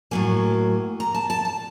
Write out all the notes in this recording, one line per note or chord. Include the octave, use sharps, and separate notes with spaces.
A2 F#3 A#3 G#5
A#5
A5
A5
A5